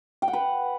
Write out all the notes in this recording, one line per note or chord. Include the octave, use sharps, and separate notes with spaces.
G5
F#5
B4